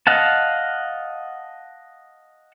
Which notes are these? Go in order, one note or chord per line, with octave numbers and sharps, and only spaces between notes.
D#5 F5 F#5 A5